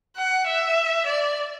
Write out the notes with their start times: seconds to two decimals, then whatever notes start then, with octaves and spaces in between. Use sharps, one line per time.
0.17 F#5
0.47 E5
1.06 D5